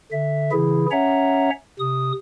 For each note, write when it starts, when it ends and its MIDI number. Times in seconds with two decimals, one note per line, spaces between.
0.12 0.51 50
0.12 0.51 76
0.52 0.86 49
0.52 0.86 52
0.52 0.86 64
0.52 0.86 68
0.91 1.50 61
0.91 1.50 73
0.91 1.50 76
0.91 1.50 78
0.91 1.50 82
1.79 2.12 48
1.79 2.12 87